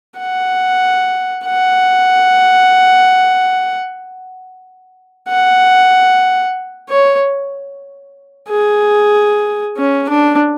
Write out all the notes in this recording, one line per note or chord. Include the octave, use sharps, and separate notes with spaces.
F#5
F#5
F#5
C#5
G#4
C#4
D4